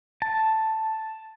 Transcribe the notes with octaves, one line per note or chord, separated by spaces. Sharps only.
A5